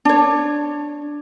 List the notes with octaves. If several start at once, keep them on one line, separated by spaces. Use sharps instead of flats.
D4 C#5